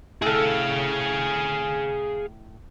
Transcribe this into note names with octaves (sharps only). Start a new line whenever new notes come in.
A2 G#4 A4 F5